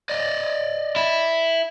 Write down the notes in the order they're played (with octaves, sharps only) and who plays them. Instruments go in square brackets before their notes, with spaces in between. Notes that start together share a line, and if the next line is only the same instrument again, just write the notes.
[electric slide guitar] D5 D#5
[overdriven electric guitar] E4